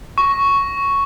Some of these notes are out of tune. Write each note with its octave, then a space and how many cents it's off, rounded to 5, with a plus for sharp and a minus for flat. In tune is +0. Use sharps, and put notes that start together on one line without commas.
C#6 +0